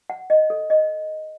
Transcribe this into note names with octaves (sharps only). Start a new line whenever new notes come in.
F#5
D#5
A4
D#5